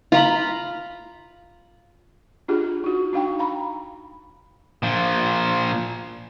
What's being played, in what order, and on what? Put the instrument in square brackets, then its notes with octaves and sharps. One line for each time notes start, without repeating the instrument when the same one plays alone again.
[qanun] F4 A#5 B5
[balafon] D4 F4 G4 G#4
D#4 F#4
D4 D#4 F5 G5
F5 A#5 B5
[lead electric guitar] A#2 F3